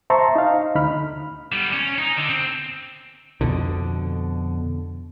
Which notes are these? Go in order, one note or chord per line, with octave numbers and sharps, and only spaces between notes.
C5 E5 A5 A#5 C6 C#6
D#4 F5
D2 D3 D#4 B5 F6
G3 B3
C#4
D#4
D3
C4
F2 B2 D3